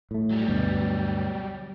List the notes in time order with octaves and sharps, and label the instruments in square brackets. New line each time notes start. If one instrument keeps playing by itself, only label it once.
[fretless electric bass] A2 A3
[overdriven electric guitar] F#3 G3
[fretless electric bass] D2 G2 B2